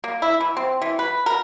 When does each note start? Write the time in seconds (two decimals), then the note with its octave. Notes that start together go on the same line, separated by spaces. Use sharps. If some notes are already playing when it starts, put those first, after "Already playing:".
0.04 A#3
0.22 E4
0.41 E3
0.57 C4
0.82 E3
0.99 B4
1.26 A#4